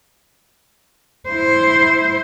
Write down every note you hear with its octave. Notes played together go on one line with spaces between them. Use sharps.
E4 C5